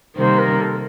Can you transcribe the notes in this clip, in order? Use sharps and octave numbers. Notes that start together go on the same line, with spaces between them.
C3 D#3 G3 A#3 C5
A#4
A4